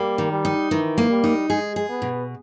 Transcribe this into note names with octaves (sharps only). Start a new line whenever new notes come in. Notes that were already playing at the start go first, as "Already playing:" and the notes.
Already playing: G3 A#3
D#3
G3
D#4
D#3 E3
A#3
G3
D#4
G#3 G#4
G#4
B3
B2